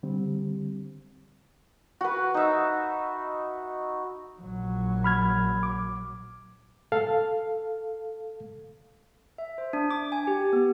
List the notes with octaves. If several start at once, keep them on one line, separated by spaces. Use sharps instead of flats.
D3 G3 C4
F#4 B4
D#4 E5
A#1 F#3
B5 F6 G#6
D6
A4 F5
E5
C5
D4
D6
G#5
G4
B3